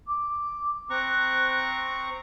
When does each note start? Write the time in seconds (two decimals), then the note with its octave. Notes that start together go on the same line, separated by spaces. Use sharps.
0.06 D6
0.90 C4 A#5 C#6 F#6